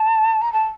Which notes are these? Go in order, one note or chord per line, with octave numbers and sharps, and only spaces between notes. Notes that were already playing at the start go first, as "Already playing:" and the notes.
Already playing: A5
A#5
A5